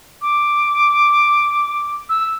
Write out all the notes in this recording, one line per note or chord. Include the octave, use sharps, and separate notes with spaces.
D6
E6